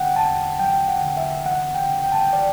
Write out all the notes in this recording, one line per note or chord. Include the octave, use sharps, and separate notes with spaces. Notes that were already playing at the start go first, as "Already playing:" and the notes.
Already playing: D3 F#5 G5
E2 A5
F#3 G5
F#5
D3
E5
E3 F#5
G5
C#3
G5
A5
G5
E3 D5